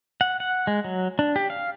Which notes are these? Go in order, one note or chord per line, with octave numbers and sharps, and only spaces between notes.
F#5
F#5
G#3
F#3
D4
G4
F5